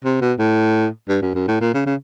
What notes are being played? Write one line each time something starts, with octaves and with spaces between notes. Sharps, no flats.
C3
B2
A2
G2
F#2
F#2
A2
A#2
C#3
C#3